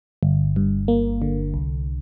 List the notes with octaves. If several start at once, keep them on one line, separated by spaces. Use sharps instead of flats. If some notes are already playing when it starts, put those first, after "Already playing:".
G1
G2
A#3
D3
C2